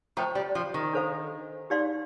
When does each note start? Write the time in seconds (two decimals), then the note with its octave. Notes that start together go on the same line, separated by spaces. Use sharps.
0.17 F3 A3 C5 G5 A#5
0.35 G3
0.55 F3
0.74 D#3
0.93 D4 A4 C5 F5
1.70 D#4 G4 D5 F5 C6